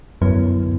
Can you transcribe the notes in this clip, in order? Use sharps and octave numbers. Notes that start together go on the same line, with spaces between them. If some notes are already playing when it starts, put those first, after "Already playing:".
F#2 D3 B3 E4 B4